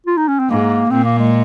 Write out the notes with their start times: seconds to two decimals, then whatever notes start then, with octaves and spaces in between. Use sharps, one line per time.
0.07 F4
0.17 D#4
0.28 C#4
0.40 C4
0.50 G#2 A#3
0.91 A#2 C4
1.05 A#3
1.19 G#3